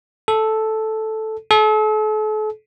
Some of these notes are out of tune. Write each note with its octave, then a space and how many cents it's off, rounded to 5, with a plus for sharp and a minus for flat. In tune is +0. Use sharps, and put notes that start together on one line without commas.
A4 -5
A4 -40